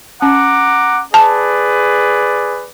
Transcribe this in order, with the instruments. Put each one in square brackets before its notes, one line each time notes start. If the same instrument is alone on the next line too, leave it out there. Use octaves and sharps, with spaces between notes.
[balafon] C#4 [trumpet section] F#5 A#5 D6
[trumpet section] G#4 B4 D5 [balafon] A5